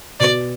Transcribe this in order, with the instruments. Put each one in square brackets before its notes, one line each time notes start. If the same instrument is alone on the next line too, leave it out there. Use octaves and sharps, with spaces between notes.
[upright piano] B2 [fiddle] D5